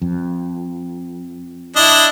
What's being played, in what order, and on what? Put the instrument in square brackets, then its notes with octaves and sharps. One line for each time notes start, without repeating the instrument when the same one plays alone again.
[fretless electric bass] F2
[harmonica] D4 E4 D#5